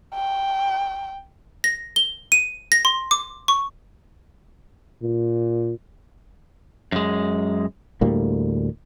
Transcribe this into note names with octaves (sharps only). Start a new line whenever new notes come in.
G5
A#6
G7
D#7
A#6
C6
D6
C#6
A#2
F#2 G#3
D2 A2 G3 A#3